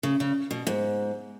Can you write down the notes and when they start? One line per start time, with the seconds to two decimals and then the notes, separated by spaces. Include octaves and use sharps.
0.03 C#3
0.20 C#3
0.51 B2
0.67 G#2